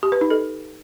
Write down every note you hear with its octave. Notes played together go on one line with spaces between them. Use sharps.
G4
B4
D#4
A4